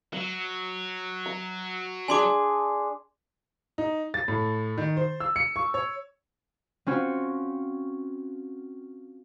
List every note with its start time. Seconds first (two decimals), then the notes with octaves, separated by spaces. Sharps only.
0.13 F#3 E6
1.26 A#5
2.08 D4 G#4 G#5 C6 D6
3.78 D#4
4.14 A6
4.28 A2
4.78 D#3
4.97 C5
5.20 E6
5.36 C#7
5.56 C#6
5.74 C#5
6.86 C4 C#4 F4 F#4